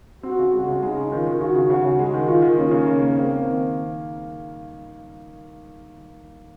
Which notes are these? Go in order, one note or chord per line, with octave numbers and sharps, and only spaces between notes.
C4 F#4
C#3
G#3 F#4
C#3
G#3 D#4
C#4
D#3 F4
D#3
C#3 F#4
C#3
C#3 F#4
C#3
G#3 F#4
D#3
D#3 F4
D#3
A#3 C#4
C#3
A#3
A#3
A#3 C4
A#3
D#3